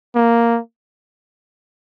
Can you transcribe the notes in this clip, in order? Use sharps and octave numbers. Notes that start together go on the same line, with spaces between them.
A#3